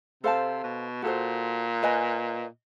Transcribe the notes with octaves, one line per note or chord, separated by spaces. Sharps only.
C3 A4 C5 F5 A5
B2
A#2 F#4 A4 C5
B4 D#5 G#5